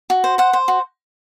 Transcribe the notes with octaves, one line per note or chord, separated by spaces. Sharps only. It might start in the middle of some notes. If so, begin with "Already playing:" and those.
F#4
C5
C5 F#5
C5
F#4